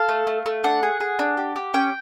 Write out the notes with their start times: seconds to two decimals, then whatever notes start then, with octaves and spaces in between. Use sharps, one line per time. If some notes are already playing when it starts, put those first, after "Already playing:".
Already playing: A4 F5
0.09 A3
0.27 A3
0.46 A3
0.64 D4 F#5
0.83 G#4
1.00 G#4
1.19 D4
1.37 G4
1.56 G4
1.74 C#4 G5